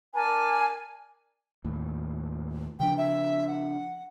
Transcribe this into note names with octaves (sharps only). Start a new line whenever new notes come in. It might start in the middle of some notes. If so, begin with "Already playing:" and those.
D4 A#4 G#5 A5
D#2 A2
C#3 F3 D4 G5
E5
F#5